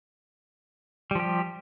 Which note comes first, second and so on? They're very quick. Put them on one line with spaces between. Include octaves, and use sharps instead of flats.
G3 F3 G4